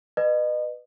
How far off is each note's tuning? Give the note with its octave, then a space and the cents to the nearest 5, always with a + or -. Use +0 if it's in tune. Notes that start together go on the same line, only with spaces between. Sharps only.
B4 +0 D#5 -35